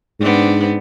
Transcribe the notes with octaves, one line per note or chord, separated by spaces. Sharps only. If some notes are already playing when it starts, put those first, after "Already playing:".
G#2 B3 C4 D4